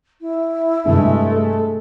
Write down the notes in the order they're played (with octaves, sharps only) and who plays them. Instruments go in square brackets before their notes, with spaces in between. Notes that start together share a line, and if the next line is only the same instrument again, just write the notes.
[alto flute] E4
[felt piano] G2 C3 [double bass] G#3 A3
[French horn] A4